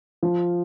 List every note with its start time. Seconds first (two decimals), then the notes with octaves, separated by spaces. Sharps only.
0.23 F3